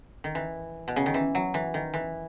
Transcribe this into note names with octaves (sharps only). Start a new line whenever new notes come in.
D#3
E3
B2
C#3
D#3
E3
F#3
E3
D#3
E3